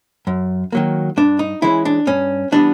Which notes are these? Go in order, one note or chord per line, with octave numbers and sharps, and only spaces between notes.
F#2
D#3 F#3 A#3
G2 D4
D#4
E3 G#3 C#4 E4
D4
G2 C#4
E3 G3 B3 D4